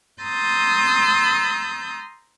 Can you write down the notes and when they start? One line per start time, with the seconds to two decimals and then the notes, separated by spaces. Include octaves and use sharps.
0.22 A#5 C6 D#6 E6 G6 A6